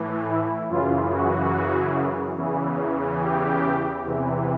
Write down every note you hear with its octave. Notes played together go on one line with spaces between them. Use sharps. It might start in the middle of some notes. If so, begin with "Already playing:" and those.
Already playing: A2 E3
E4
F#2 C#3 E3 F4
F#4
E2 C#3 E3
G4
E2 C3 E3